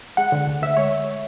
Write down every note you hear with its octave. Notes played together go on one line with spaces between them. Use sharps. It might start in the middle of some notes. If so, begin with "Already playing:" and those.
G#3 F#5
D3
D2
D2 E5
G#3 C#5